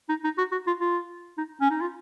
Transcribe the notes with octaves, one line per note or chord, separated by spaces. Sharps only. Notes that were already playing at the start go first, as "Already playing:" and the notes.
D#4
D#4
F#4
F#4
F4
F4
D#4
C#4
D#4
F4